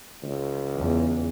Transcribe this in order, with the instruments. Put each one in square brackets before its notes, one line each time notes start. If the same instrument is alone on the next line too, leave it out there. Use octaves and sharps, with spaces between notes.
[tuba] C#2
[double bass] E2